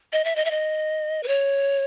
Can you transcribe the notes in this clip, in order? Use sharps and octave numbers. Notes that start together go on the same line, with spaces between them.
D#5
E5
D#5
E5
D#5
B4
C#5